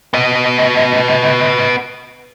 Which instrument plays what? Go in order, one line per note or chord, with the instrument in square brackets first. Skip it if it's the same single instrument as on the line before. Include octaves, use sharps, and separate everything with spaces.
[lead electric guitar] B3 D#5